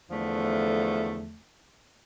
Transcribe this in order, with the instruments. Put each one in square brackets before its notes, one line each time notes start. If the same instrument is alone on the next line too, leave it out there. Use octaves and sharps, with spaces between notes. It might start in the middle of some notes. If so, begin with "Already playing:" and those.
[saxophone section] E2 D3 F3 A3